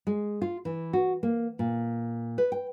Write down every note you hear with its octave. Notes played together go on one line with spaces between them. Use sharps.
G#3
F4
E3
F#4
A#3
A#2
B4
G5